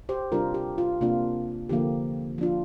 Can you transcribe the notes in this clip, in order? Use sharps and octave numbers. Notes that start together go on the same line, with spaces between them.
G4 C5
C3 G3 D4 F4 A#4
G4
F4
C3 A#3 D4 F4
D3 F3 A#3 G4
F3 D4 F4